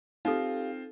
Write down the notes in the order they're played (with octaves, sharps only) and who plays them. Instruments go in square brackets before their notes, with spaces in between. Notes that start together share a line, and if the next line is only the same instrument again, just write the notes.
[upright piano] C4 F4 [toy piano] D#4 A4 [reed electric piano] G4 F5